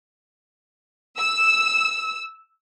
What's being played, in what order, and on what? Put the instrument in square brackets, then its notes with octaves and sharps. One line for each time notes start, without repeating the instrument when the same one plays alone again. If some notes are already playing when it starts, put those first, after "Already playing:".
[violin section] E6